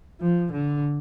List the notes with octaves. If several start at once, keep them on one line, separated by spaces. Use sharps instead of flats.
F3
D3